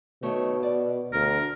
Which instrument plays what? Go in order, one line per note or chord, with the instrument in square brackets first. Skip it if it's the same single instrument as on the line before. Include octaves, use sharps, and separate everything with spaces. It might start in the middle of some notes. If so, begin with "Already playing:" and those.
[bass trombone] B2 [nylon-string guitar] D#3 A3 C#5
[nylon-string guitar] D5
[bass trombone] D2 [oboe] A#4